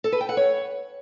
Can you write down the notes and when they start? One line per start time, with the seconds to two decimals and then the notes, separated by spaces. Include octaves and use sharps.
0.04 A4
0.12 B4
0.21 G5
0.29 F#5
0.37 C#5